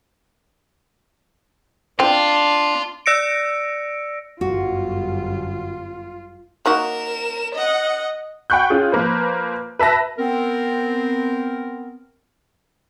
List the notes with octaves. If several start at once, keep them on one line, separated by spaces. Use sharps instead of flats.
C4 D4 F4
D5 E6 A#6 C#7 D7
G1 F#2 F4 F#4
A#3 D#4 F#4 A#4 E7
D#5 F#5
F#5 G5 B5 C#6 F#6 G6
C#4 F4 G#4
F3 A#3 B4 C5
B4 E5 A5 A#6
B3 C4 A#4